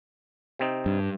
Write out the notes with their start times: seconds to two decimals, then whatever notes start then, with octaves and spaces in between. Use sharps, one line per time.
0.59 C3 C4 D#4
0.86 G2